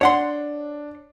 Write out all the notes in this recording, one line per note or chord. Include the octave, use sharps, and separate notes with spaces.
D4 C#5 F#5 C6